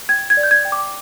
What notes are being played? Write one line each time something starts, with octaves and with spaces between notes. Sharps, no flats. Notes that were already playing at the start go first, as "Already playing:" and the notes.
G5 G#6
G#6
D5
G6
G#6
G5
D6